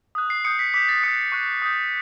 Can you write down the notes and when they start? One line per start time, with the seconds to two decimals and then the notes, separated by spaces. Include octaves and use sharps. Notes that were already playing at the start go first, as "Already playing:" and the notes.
0.15 D#6 F#6
0.30 C7
0.45 D#6 G6 C#7
0.59 B6
0.74 D6 G6 B6
0.89 A6
1.03 D#6 F#6 C#7
1.32 C#6 F#6
1.62 D#6 G6